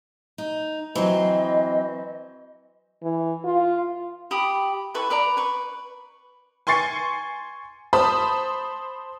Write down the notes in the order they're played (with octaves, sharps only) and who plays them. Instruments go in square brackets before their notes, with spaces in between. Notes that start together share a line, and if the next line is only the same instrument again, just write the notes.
[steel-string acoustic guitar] D#4
[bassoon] E3 [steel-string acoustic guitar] F#3 C4 [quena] D#5
[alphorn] E3
F4
[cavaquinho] G4 B5 D#6
E4 A4 B4 C#6
B4 D5 A#5 B5
B4 C#6
[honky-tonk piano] G#5 C6 C#6 A6 C7 C#7
C5 A5 B5 D#6